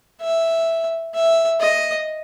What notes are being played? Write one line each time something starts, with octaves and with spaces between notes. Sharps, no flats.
E5
E5
D#5